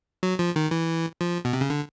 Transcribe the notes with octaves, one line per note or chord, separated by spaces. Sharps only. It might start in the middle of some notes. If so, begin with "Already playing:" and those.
F#3
F3
D#3
E3
F3
B2
C3
C#3
D3